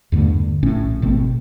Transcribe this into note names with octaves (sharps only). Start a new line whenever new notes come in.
E2 G2 D3 A3
A#1 A2 C#4
G#1 B2 A3 C4